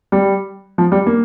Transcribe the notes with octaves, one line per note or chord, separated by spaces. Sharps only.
G3
F3
G3
A#3